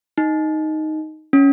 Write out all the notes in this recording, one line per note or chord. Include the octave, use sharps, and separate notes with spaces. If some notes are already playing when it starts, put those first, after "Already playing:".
D#4
C#4